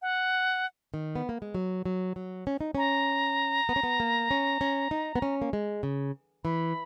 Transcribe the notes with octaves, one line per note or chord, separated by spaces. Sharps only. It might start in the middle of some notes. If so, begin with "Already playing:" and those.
F#5
D#3
B3
A#3
G#3
F#3
F#3
F#3
C#4
D#4
C#4 A#5
B3
C#4
B3
A#3
C#4
C#4
D#4
B3
C#4
A#3
G#3
C#3
E3 B5